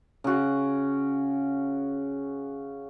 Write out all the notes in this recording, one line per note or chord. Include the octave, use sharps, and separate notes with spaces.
C#3 F#4